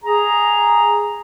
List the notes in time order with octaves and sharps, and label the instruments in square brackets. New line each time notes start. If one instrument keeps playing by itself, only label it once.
[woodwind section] G#4 A#5